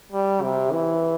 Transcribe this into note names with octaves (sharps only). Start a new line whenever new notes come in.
G3
C3
E3